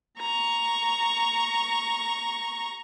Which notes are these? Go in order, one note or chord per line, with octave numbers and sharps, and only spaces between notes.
A#5 C#6